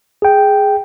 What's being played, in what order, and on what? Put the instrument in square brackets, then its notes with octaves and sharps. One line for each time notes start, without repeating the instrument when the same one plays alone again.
[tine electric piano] G#4 G5